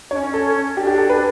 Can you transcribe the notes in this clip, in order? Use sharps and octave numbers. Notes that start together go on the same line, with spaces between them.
D4 C#5
C#4
A4
D4 G4
G4
A4
B4